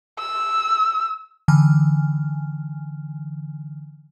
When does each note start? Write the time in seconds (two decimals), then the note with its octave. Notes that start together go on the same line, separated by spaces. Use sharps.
0.19 E6
1.48 D3 E3 G#5 F6